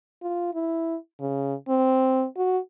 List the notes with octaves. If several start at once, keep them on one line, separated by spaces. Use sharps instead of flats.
F4
E4
C#3
C4
F#4